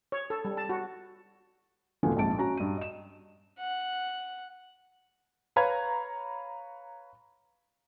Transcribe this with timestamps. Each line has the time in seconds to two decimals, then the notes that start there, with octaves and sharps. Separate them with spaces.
0.12 C#5
0.30 A4
0.45 G3
0.57 A5
0.69 F#4
2.03 D#2 A#2 F#3 A3 B3 G#5
2.16 A#1 F2 G#2 A5 D7
2.38 C#4 F#4 A#5
2.57 G2 D#7
2.77 D#5 E7
3.60 F#5
5.56 B4 C#5 F5 A#5 B5 G#6